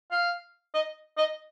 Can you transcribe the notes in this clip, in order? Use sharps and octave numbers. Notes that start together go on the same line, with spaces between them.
F5
D#5
D#5